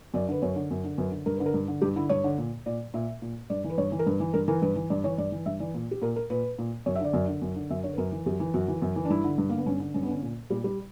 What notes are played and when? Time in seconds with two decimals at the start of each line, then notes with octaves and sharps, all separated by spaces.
0.14 F#2 D5
0.28 D3 B4
0.42 F#2 C#5
0.56 D3
0.71 F#2
0.84 D3
0.98 F#2 B4
1.12 D3
1.26 G2 A#4
1.36 D3 B4
1.46 A#4
1.54 G2
1.68 D3
1.81 G2 G4
1.96 D3 E4
2.09 G2 C#5
2.24 D3
2.38 A#2
2.66 A#2 D5
2.94 A#2 E5
3.22 A#2
3.50 G2 D5
3.64 E3
3.70 B4
3.78 G2 C#5
3.92 E3
3.99 A#4
4.07 G2 B4
4.20 E3
4.33 G2 A#4
4.48 E3 A#4
4.62 G2 B4
4.76 E3
4.90 G2 D5
5.04 E3 C#5
5.18 G2 D5
5.32 E3
5.46 G2 E5
5.60 E3 D5
5.74 A#2
5.91 G4
6.02 A#2 A#4
6.16 A#4
6.30 A#2 B4
6.58 A#2
6.86 F#2 C#5
6.96 E5
7.01 D3 D5
7.13 F#2
7.28 D3
7.42 F#2
7.56 D3
7.70 F#2 E5
7.83 D3 C#5
7.93 B4
7.98 F#2 A#4
8.12 E3
8.26 F#2 G4
8.40 E3
8.54 F#2 F#4
8.68 E3
8.82 F#2
8.96 E3
9.05 D4
9.10 G2 E4
9.24 D3
9.38 G2
9.49 D3 A#3
9.58 B3
9.66 G2 C#4
9.80 D3
9.94 G2 C#4
10.03 B3
10.08 D3 C#4
10.22 A#2
10.50 A#2 G3
10.64 G3